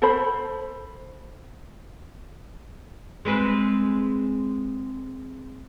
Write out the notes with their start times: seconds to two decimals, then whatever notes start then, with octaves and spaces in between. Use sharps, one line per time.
0.02 A4 C5 B5
3.25 G#3 C4 B4